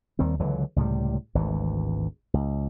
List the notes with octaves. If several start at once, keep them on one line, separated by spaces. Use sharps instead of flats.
D#2 D#3 G3 C4
C#2 D3 E3 F#3
C#2 A2 C3 G3
G#1 D2 E3
C#2